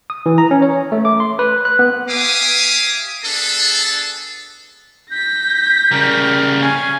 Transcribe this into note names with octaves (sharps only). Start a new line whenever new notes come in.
D#6
E3
A#5
C#4
C#5
A3
D6
C6
B4
F#6
B3
G4 E5 F5 G#5 D6 D#6
B3 D4 G#4 A4
G6 A#6 B6
C#3 G3 A#4
C#4 F5 G#5